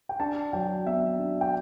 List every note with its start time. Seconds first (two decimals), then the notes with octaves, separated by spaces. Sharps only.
0.09 G5
0.20 D4 A5
0.53 F#3 G5
0.86 B3 E5
1.19 D4
1.41 G5